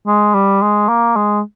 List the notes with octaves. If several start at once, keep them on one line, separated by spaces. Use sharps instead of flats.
G#3
G3
G#3
A#3
G#3